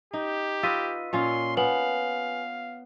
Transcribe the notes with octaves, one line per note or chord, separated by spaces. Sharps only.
D#4 G4
F4 B4 D#5 E6 B6 D#7
A#2 C#4 F4 C6
B3 B4 F5 G#5 F#7